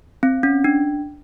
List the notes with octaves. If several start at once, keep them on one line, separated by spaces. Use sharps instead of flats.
C4
C#4
D4